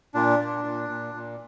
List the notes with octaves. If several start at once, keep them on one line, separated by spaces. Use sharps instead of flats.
A#2 D4
A#2
A#2
A#2
A#2